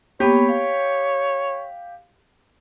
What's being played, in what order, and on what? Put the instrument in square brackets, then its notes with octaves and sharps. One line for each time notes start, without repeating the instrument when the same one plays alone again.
[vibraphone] A#3 B3 B5 [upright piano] G4 [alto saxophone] C#5
[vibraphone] F5